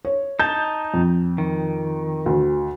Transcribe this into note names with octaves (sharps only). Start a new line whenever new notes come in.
C#5
D#4 A5 G6
F2
D#3
D2